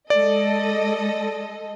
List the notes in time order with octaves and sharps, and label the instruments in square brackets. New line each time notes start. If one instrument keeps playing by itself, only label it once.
[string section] G#3 A4 D#5 [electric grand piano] D5